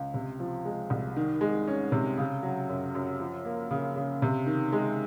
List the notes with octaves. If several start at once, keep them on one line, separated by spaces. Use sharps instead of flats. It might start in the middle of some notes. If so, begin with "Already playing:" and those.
Already playing: C#2
C3
F3
G#3
C2
D#3
G#3
C#4
C3
C#3
F#3
F#2
F#2
F3
A#3
C#3
C#3
C3
D#3
G#3